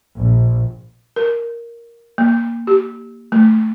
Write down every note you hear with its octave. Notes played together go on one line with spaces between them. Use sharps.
A#1
A#4
A#3
G4
A3